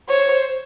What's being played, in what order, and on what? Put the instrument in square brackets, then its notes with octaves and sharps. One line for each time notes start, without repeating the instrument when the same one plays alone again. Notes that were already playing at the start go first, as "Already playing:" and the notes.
[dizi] C5 [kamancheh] C#5
[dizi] C5